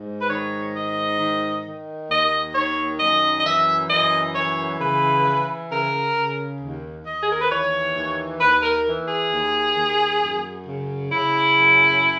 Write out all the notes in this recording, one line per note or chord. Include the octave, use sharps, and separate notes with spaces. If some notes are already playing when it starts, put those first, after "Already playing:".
Already playing: G#2
B4
D#3 C#5
G#2 D#5
D#3
D#3
D#2 D#5
D#3 C#5
F#2 D#5
D#5
E3 E5
F#2 D#5
E3 C#5
C#3 B4
E3
C#3 A#4
C#3
D#2
D#2 D#5
G#4
A#4
B4
E3 C#5
D#2
D#2 B4
A#4
E3
G#4
D#2
D#2
F#2
C#3
C#3 E4
F#2